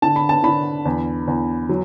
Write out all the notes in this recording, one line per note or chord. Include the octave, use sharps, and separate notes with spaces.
D3 A5
B5
A5
D3 B5
E2
E2
F#3